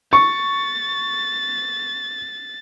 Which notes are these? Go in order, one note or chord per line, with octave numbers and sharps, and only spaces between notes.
C#6 A6